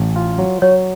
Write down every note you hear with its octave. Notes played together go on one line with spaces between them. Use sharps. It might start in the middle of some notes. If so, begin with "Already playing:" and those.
Already playing: A1
F4
F#3
F#3 C#5